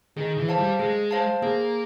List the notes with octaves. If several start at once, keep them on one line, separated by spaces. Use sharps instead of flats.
D#3 G#4
E3
C5 F5 A5
G3
G#3 G#4
C5 F5 A5
A#3 G#4